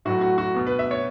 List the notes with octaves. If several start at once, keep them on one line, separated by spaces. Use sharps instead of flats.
A2 F#3 A3 F#4
F#4
F#4
B2 B3
B4
E5
C#5